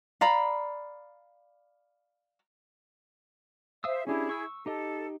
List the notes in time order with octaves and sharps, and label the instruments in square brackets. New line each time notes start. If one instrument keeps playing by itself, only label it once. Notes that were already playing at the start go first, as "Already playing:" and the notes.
[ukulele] D5 F5 A#5 B5
[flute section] C5 E5 [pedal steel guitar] F5 D#6 E6
[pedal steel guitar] C#4 D4 G4 [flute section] E4 G#4
[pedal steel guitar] C#6 E6
[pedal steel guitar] D#4 G4 D#5 [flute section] A4